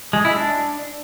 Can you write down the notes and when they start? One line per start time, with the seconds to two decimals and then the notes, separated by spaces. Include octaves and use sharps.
0.13 G#3
0.25 E4
0.36 D4